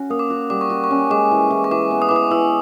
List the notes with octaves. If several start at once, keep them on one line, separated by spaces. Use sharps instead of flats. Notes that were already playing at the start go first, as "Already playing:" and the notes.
Already playing: C#4 F#4
A#3 D#6
D6
F#4
G3 D6
C#6
F#4
C#6
C#4
G#3 D6
E3
E3
C#6
E3 D6
B3
D#6
E3 D6
D#6
E3 E6